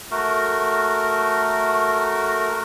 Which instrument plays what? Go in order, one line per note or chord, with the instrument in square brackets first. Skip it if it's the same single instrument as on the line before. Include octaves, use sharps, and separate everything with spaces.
[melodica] A3 F#4 A#4